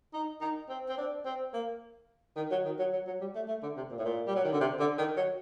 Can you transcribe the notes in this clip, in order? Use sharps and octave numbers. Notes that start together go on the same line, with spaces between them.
D#4
D#4
C4
C4
D4
C4
A#3
D#3
F#3
D#3
F#3
F#3
F#3
G3
A3
A3
D3
C3
A#2
A2
A#2
G3
F#3
D#3
D3
C3
D3
D#3
F#3